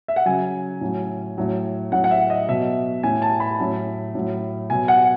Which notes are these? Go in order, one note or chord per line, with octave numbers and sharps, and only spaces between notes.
E5
F#5
C#3 F#3 G#5
A2 F#3
A2 F#3
A2 F#3 F#5
F#5
E5
D#5
B2 F#3 E5
A2 E3 G#5
A5
B5
A2 F#3
A2 F#3
B2 F#3 G#5
F#5